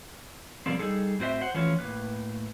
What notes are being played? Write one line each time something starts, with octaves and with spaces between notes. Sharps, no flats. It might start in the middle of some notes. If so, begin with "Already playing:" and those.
B2 F3 G3 A#3 C4
G3 G#3 D#4 G#4 A4
A2 C4 F#4 C5 E5
C5 F#5
E3 F3 A3 C#4 F4
A2 A#3 B4